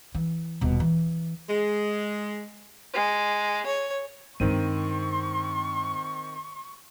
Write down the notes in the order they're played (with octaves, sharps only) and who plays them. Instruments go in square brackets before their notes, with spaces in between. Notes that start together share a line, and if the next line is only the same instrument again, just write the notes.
[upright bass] E3
D#1 B2
E3
[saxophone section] G#3
[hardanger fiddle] G#3
C#5
[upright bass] G2 G#3 [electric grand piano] D#3 C4 D#7 [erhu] C#6